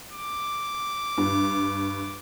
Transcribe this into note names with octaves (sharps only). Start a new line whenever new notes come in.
D6
G2